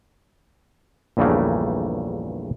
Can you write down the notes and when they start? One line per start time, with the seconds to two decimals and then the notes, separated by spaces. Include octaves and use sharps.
1.17 A#1 E2 G2 C#3 A3 A#3